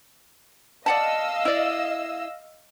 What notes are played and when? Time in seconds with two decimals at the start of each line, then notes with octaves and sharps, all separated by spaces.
0.86 D5 D#5 F5 F#5 A5 E6
1.45 E4 D5